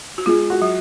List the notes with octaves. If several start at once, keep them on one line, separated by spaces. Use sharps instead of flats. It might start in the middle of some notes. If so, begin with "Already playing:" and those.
F#4
G#3 F4
F#4
F#3